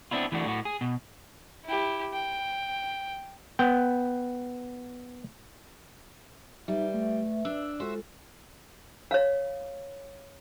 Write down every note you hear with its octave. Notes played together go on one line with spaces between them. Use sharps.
B3 C4 D4 E4 F4
E3 A3 D4 F#4
A2 F#4
G#4
B2
E4 G4
G5
B3 G5
G3 D#4 B4 E5
A3
D4 E6
G#3 F4 F#4 A4 C5 E5
C#5 F5